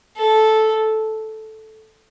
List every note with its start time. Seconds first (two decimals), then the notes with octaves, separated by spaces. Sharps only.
0.17 A4